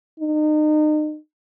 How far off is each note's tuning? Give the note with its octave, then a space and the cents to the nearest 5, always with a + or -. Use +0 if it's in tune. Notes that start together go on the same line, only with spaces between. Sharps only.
D#4 -35